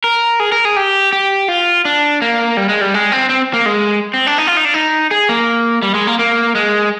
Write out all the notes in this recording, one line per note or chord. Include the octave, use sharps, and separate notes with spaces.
A#4
G#4
A#4
G#4
G4
G4
F4
D4
A#3
G3
G#3
G3
G#3
C4
C4
A#3
G#3
C4
D4
D#4
F4
D#4
D4
D#4
G#4
A#3
G3
G#3
A#3
A#3
G#3